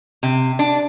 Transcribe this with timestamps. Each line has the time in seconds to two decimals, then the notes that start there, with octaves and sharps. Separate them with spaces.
0.23 C3
0.59 D4